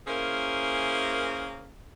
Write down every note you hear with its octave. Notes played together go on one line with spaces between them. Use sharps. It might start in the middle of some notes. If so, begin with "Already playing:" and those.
A#3 C#4 E4 G#4 A#4 C5